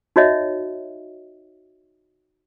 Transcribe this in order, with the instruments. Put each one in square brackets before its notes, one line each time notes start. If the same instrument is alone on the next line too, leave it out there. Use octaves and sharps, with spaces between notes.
[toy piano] D#4 F#4 C#5 D#5 E5